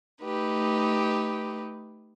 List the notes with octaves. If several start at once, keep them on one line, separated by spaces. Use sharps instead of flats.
A3 D#4 G4 B4